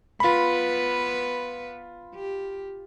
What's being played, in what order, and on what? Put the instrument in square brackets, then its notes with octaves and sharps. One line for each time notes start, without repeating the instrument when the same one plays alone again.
[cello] B3 B4 [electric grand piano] F4 B5
[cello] G4